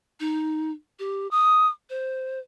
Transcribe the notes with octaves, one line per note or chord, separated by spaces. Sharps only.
D#4
G4
D#6
C5